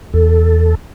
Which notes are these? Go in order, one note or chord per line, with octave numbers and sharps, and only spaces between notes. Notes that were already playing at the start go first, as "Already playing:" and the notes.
E2 A4